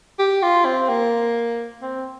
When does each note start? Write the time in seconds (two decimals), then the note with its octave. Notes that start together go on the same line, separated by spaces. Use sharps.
0.19 G4
0.42 F4
0.65 C4
0.89 A#3
1.82 C4